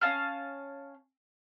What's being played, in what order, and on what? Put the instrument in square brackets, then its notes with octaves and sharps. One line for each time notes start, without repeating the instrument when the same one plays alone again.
[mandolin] C#4 F5 A5 F6